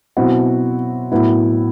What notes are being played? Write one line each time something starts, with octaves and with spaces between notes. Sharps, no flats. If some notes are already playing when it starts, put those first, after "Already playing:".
B2 F#3 C4 E4 F#4
A2 F#3 B3 E4